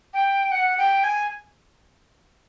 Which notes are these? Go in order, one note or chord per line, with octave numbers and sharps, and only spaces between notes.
G5
F#5
G5
G#5